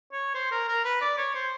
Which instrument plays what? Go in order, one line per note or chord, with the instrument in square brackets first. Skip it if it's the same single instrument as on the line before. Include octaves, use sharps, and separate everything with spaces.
[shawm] C#5
C5
A#4
A#4
B4
D5
C#5
C5